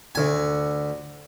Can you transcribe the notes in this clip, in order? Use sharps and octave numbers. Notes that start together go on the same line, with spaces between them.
D2 G#5